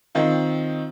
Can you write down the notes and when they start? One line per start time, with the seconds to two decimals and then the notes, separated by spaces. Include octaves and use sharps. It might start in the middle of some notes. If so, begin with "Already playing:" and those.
0.15 D#3 C4 D#4 F4